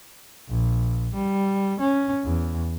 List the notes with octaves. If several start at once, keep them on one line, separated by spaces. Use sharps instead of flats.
A#1
G3
C#4
E2